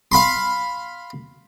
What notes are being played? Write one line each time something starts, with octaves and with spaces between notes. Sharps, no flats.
F5 B5 C6